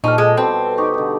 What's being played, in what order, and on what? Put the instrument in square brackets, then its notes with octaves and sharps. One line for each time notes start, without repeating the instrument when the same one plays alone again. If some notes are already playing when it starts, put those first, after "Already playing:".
[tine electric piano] A#2 [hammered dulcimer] F3 G4 A4 [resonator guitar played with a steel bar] D#4 [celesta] C#6 F6
[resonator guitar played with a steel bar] G#3 [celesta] D#6
[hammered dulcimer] B2 G3 [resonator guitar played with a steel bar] C4 [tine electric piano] A4 C5 [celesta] A5
[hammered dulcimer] D#4 G4 [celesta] C#6
[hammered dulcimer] D3